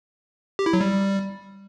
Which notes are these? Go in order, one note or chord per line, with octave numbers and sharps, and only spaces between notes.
G4
E4
F#3
G3